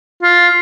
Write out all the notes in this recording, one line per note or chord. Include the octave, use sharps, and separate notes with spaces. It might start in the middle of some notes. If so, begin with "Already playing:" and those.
F4